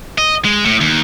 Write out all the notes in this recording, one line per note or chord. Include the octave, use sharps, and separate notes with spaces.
D#5
G#3
A2
D#2